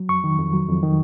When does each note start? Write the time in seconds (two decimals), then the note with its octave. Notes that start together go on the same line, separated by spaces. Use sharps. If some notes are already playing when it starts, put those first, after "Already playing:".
Already playing: F#3
0.09 F2 C#6
0.24 D#3
0.38 F2
0.53 F#3
0.68 F2
0.83 D#3